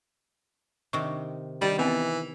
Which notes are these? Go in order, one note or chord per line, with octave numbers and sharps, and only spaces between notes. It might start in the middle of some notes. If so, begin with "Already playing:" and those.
C3 D#3 C#6
D#3 G3
E3 B3 C4